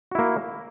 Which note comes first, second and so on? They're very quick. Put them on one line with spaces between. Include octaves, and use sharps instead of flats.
F#4 E4 A#3